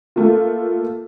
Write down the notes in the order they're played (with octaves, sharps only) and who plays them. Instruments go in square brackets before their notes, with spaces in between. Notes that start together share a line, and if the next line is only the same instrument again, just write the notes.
[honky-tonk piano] A3 A#3 F4